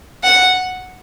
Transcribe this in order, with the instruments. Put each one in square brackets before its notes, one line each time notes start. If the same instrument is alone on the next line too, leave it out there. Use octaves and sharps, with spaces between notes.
[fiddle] F#5